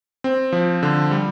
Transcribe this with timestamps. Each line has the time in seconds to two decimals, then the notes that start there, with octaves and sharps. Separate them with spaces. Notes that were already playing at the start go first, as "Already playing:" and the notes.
0.24 C4
0.52 F3
0.83 D3
1.11 G3